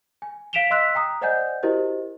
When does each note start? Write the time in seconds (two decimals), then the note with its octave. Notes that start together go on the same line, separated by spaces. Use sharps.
0.22 G#5
0.53 F5 B6 D7 E7 F7 G7
0.70 D#5 C6 E6 F#6 B6
0.95 G5 A#5 D#6
1.21 C5 D5 D#5 F#5 G#5 G6
1.63 E4 F#4 G4 A#4 C5 D#5